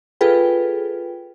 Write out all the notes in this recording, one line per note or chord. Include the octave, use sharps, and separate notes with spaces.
F4 G#4 A4 B4 G5